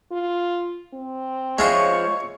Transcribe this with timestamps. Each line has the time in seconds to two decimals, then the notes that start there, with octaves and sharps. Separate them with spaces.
0.12 F4
0.94 C4
1.59 F3 G#3 E4 F4 G#4 C#5 C#6